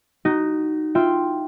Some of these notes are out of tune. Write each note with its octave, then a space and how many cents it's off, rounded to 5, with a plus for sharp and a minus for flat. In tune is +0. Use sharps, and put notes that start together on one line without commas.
D#4 -5 F#4 +25
F4 +0 E5 +0 G5 +0